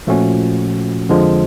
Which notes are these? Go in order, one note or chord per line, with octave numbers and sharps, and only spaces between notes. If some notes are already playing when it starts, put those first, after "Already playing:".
A#2 F3 A3 C#4 F#4
F2 D3 F3 G#3